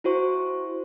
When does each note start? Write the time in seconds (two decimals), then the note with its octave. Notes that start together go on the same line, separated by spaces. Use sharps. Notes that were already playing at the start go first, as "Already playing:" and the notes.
0.04 E4 F#4 C5 C#6